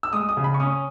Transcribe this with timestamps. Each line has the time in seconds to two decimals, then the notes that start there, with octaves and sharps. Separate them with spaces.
0.03 E6
0.13 G#3 D#6
0.29 D#6
0.37 C#3
0.44 B5
0.54 C#6
0.60 C#4 D#6